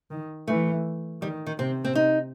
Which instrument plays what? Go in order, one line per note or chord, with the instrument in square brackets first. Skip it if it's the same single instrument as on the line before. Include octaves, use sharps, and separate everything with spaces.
[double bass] D#3
[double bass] E3 [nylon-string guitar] A3
[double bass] D#3 [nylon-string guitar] G3
[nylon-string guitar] D#3
[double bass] C3 [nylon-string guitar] C4
[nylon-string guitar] C4
D#4